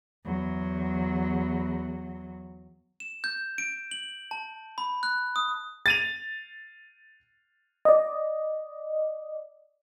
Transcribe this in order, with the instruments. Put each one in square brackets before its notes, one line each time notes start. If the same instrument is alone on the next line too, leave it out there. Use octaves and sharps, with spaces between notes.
[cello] E2 F#3
[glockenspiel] E7
G6
D7
F#7
A5
B5
F#6
D#6
[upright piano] A6 D#7 F7
[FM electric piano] D5 D#5